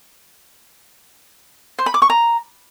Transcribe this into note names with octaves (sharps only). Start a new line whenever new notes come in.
C5
B5
D6
C#6
A#5